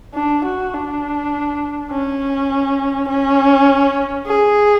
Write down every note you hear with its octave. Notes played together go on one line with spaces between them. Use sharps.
D4
F#4
D4
C#4
C#4
G#4